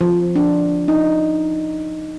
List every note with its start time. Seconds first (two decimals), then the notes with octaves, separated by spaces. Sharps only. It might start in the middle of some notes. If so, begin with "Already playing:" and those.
0.01 F3
0.36 D4
0.88 D#4